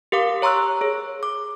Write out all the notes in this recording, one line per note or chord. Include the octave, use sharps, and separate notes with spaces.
G4 A#4 F5 D6
C#5 A#5 C6 C#6 E6 F#6
G#4 C#5
D6